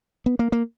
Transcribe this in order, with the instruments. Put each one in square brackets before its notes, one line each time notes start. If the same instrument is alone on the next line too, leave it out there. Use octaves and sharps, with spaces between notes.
[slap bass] B3
A#3
A#3